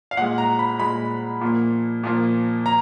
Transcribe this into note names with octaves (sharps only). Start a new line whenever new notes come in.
F5
A#2 G#3 F#5
A#5
B5
A#2 G#3 B5
A#2 F3 A#3
A#2 F3 A#3
A#5